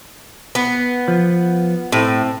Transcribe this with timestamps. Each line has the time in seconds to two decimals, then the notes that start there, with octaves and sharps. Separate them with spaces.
0.55 B3
1.08 F3
1.92 A2 C4